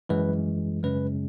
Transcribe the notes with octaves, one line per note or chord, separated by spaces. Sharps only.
F#2 E3 G#3 B4
F#2 C#3 G#3 C#4 B4